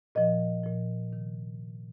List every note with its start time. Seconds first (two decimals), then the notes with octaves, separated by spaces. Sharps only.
0.15 A#2 F3 D#5
0.64 A#2 F3
1.13 C3 D#3